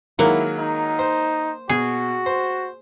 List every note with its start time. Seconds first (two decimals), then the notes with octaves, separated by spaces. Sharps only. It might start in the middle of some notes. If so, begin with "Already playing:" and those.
0.19 D#3 F#3 G#3 A#3 E4 F#5
0.59 D#4
0.99 C5
1.69 B2 F#4 G#4
2.26 C5